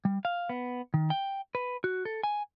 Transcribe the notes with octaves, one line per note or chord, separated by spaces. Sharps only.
G3
F5
B3
D#3
G5
B4
F#4
A4
G#5